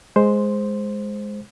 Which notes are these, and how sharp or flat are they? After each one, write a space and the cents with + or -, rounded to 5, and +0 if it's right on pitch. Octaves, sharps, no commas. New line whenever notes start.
G#3 +0 C5 +0